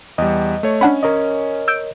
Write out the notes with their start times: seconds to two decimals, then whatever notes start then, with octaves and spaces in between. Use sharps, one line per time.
0.18 E2 G3 D#5
0.63 A3 C#5
0.81 C#4 D4 F#5 B5
1.03 A#4 C#5 D#5
1.68 E6 G6 D7